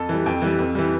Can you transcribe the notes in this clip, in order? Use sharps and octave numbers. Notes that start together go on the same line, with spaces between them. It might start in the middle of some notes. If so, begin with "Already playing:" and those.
Already playing: F2 A4
E3 G3
F2 G5
E3 G3
F2
E3 G3